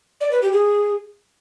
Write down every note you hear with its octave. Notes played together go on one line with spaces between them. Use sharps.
D5
B4
G4
G#4